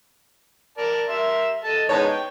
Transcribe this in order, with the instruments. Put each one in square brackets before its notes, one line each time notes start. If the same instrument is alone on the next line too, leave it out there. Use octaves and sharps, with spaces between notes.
[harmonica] A#4 D5 A5
A#4 E5 C6
A4 D#5 A5
[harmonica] G#3 B3 D#4 [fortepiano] C#5 A5
[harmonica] G5